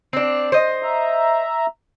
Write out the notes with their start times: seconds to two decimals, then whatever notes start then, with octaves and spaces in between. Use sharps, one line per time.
0.13 C4 D4
0.52 C5 D#5
0.83 E5 A#5